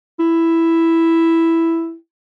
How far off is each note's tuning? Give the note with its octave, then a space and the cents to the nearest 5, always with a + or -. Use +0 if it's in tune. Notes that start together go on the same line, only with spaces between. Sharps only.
E4 +0